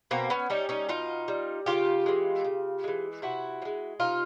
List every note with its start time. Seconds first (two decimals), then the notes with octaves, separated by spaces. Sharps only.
0.11 B2 A#3 C4
0.30 B3 C#4
0.50 G3 C#4 D#4
0.69 C#4 D#4
0.89 B2 D#4 F4
1.28 G3
1.66 C#3 F4 G4
2.06 E3 G#3
2.44 C#3
2.84 E3 G#3
3.22 C3 E4 F#4
3.62 F3
3.65 G#3
4.00 C3 D#4 F4